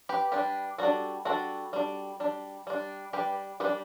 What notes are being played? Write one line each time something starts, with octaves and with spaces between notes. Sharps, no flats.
G4 B4
G3 D4 G4 B4
G3 D4 F#4 A4
G3 D4 F#4 A4
G3 D4
G3 D4
G3 D4
G3 D4 G4 B4
G3 D4 G4 B4